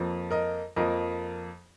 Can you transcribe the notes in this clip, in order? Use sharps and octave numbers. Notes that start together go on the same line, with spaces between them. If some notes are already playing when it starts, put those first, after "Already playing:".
Already playing: F2 F3 A#3
A#4 D#5
F2 F3 A#3 A#4 D#5